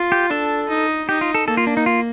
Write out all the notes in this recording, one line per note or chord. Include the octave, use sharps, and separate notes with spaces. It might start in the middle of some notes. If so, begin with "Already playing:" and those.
Already playing: F4
G4
D4 A4
D#4
D#4 G4
F4
A4
A#3 A4
F4
D4
D#4
F4